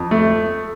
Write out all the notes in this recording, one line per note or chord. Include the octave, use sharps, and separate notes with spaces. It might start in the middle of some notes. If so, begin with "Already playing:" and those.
Already playing: F2
A3